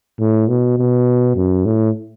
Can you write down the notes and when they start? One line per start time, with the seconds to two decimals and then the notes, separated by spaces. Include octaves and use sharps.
0.19 A2
0.49 B2
0.78 B2
1.36 F#2
1.66 A2